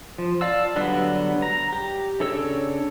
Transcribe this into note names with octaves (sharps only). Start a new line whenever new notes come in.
F3
D5 F5 A5 E6
D3 F#3 G3 B3 D4
A#5
G4
C#3 D4 A4 C#5 E6